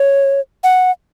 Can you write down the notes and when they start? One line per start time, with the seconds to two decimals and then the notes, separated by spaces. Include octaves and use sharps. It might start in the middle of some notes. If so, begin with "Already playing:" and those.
Already playing: C#5
0.64 F#5